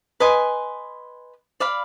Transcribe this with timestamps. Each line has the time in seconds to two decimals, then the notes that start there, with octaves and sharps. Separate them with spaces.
0.20 B4 D#5 G#5 C6
1.60 D5 F5 B5